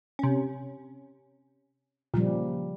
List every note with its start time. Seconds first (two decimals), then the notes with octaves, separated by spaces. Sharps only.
0.19 C3 C#4
2.14 A#2 C#3 F3 G3